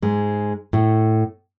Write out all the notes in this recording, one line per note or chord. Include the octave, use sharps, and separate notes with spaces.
G#2 G#3
A2 A3